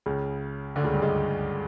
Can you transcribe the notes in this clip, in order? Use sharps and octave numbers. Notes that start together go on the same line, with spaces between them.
C#2 C#3
D2 D3
C#2 C#3
G2 G3
G#3